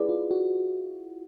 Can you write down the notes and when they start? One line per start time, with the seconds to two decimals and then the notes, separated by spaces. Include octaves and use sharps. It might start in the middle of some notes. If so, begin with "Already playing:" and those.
Already playing: E4 G#4 B4 D5
0.09 F4
0.31 F#4